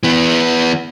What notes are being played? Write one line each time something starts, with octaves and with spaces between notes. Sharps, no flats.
E3 B3